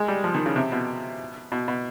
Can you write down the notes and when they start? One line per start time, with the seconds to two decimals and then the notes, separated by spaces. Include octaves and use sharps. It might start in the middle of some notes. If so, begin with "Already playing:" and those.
Already playing: G#3
0.08 G3
0.24 F3
0.35 D#3
0.46 C#3
0.56 C3
0.72 B2
1.52 B2
1.68 B2